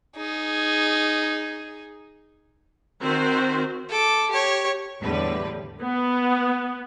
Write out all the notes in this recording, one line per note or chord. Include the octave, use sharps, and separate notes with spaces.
D#4 G#4
D#3 C4 F#4 C5
A4 D6
G4 C#5
E2 A2 D3 G3 B4
B3